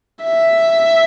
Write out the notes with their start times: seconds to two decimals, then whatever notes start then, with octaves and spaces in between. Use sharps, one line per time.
0.24 E5